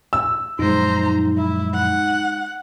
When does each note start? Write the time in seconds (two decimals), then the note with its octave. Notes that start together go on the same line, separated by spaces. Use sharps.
0.13 E6
0.59 F#2 A#2 F3 G#3 D#4 C5 A#5
1.37 E4
1.74 F#5